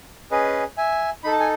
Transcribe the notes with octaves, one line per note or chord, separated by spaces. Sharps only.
C#4 G#4 B4 D#5
E5 G#5
D#4 A4 B5
A5
G#5